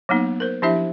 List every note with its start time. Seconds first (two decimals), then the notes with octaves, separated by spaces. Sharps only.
0.09 F#3 A#3 B3 D#4
0.40 A#4 C5
0.62 F3 D4 E4 G4 C5 E5